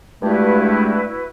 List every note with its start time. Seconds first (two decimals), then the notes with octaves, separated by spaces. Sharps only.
0.23 G2 G#3 A3 E4 F#4 B4